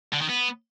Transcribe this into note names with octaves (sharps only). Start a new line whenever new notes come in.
D3
D#3
B3